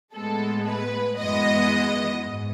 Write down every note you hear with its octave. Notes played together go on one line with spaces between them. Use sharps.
A2 G#3 B3 A4
B4
F#2 E3 G#3 B3 D#5
G#2